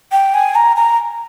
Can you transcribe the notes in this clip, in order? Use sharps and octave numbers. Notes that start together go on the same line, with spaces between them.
G5
G#5
A#5
A#5